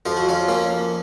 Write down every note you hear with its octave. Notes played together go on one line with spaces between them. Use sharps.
F2 F3 F4
F#4
C#4 F4
A#3 C#4